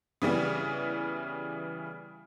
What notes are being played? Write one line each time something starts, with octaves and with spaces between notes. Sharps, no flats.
C#3 E3 G3 B3